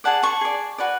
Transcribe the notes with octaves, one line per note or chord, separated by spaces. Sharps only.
G#4 D5 F#5 A5
A5 C#6
G#4 D5
F#4 B4 D5